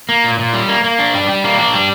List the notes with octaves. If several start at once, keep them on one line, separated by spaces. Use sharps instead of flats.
A#3
A#2
A#2
G3
A#3
A#3
D4
G3
G3
A#3
D4
G3